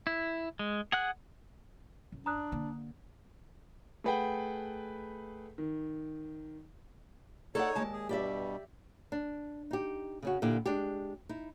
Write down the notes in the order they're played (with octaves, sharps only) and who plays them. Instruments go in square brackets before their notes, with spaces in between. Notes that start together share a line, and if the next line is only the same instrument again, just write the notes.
[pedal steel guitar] E4
G#3
G#4 F#5 F#6
[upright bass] F#2
[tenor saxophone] D4 [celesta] A#5 D#6 F#6
[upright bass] D3 A#3
[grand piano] A3 G#4 B4 F#5 G5
D#3
[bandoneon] D#4 C#5 [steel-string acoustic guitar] A4 D5 F#5
[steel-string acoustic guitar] D#2 G#3 A5
[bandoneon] G#4
[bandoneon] G2 B2 G3 [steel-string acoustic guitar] G4 D5 E5
[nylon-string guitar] D4
D#4 G4
C#3 C#4 F#4
A#2 D3 E4 G4
G#3 D4 G4
D#4 E4